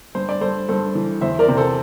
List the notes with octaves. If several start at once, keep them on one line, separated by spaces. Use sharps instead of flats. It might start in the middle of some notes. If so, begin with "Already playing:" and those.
G2 C5
D5
G2 A4 C5
G2 A4 C5
E3
E2 C5 E5
A#4 D5
C3
A4 C5